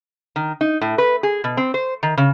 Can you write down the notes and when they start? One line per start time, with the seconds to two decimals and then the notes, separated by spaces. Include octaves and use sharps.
0.36 D#3
0.61 D#4
0.81 A2
0.98 B4
1.23 G#4
1.44 B2
1.57 C4
1.74 C5
2.03 D#3
2.17 C#3